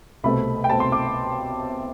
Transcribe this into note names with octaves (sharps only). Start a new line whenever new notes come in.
C2 B2 A3 C4 B5
G5
C2 B2 A3 C4 A5
C6
D6